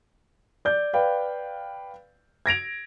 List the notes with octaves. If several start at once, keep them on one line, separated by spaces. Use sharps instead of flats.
D5 G6
B4 D5 F5 G5
G#6 A#6 D7 F7